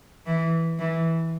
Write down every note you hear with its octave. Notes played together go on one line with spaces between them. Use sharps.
E3
E3